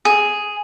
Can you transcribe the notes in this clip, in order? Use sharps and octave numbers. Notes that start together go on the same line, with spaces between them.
G#4